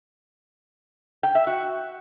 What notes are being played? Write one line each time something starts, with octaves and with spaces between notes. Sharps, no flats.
G5
E5
F#4